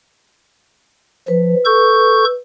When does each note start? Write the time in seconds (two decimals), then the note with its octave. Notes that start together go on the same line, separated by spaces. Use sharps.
1.28 F3 B4
1.65 A4 C#6 G6